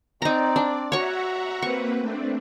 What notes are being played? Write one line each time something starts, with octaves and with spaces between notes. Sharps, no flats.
C4 D#4 D5 A#5
D4
F#4 C#5 E5 F#5 A#5 C#6
A#3 C4 B4 C#6
A3 C4 D4